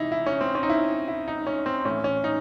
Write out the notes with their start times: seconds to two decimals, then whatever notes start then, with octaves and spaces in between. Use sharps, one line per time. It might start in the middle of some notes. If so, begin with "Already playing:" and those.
Already playing: C3 E3 D#4 E4
0.12 E4
0.26 C#4
0.41 C4
0.55 C#4
0.63 D#4
0.69 E4
1.08 E4
1.28 D#4
1.47 C#4
1.66 C4
1.85 A2 E3 C#4
2.04 C#4
2.24 D#4